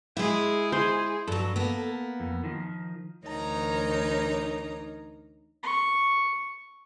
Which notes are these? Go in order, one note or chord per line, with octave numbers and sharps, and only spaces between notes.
G#3 E4 G#4
C5
G2 F#3 A4
A#3 B3
F2
D#3 F3
D2 E3 D#4 A#4 C#5 A#5
C#6